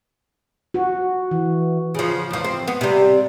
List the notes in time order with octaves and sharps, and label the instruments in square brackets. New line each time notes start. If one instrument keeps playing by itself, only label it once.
[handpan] F#4
E3
[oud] C#3 F3
E2 F3
C4
B3
C3 G3